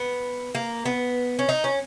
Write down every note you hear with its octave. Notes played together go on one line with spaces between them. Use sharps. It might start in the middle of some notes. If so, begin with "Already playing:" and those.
Already playing: B3
A#3
B3
C#4
D#4
C#4